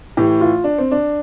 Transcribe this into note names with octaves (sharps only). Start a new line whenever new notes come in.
A2 E3 G4
F4
D4
C4
D4